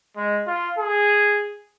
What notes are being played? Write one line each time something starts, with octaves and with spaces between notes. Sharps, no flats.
G#3
F4
G#4